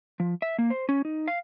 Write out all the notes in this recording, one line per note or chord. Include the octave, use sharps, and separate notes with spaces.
F3
E5
A#3
C5
C#4
D#4
F5